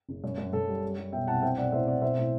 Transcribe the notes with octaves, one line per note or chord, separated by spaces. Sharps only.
F#1
F#2
F#2
F#2 A4
G3
G3
G3
B2 E5 G5
C2 F#5 A5
C4 E5 G5
B1 D5 F#5
A2 C5 E5
C4 D5 F#5
B1 C5 E5
A2